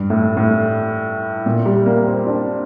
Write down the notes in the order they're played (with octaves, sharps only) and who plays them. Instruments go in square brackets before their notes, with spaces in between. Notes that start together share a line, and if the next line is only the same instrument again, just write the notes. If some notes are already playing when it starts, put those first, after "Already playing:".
Already playing: [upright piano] G2
A2
A2
A#2
G3
A#3
C4
D4